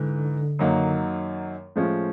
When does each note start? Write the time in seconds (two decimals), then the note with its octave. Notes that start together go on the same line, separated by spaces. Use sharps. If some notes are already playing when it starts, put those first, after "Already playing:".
Already playing: G#2 D3 E3
0.59 F#2 D#3 F#3 A#3 D#4
1.76 A2 F3 G#3 C#4 F4